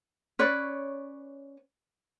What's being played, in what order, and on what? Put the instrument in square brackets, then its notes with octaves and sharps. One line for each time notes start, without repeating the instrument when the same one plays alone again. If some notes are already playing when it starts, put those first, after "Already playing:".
[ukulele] C#4 B4 C#5 D5